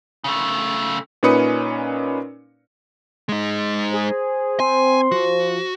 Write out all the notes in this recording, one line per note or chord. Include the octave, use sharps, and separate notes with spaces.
C#3 A3
A#2 C#4 D#4 B4 D#6 C#7
G#3 D#4
G#4 C5
C4 G#5 C6
F3 F#4